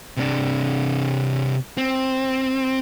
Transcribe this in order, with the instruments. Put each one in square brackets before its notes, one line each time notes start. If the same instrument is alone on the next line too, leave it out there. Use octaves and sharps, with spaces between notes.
[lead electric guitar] C3 D4
C4